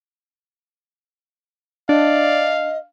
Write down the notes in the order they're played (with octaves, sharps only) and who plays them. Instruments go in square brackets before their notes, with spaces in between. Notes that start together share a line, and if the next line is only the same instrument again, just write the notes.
[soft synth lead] D4 [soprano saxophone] D5 [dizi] D#5 [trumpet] F5